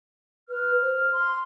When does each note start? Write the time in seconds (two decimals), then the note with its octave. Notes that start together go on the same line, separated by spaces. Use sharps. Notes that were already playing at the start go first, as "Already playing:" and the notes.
0.49 B4 F6
0.81 C5
1.12 C6